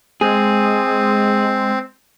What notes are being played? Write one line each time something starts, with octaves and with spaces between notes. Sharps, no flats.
G#3 C4 G#4